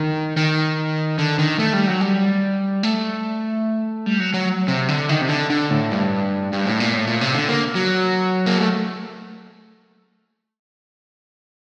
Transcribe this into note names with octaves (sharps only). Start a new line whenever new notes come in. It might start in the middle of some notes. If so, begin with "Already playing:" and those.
Already playing: D#3
D#3
D3
D#3
A3
G3
F#3
G3
A3
G3
F#3
F#3
C3
D3
D#3
C3
D3
D3
A2
G2
G2
A2
A#2
A2
A#2
C3
D3
A#3
F#3
A#3
A3